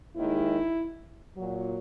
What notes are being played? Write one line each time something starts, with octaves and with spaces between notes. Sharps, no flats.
D#2 D#3 G#3 E4
A#2 F#3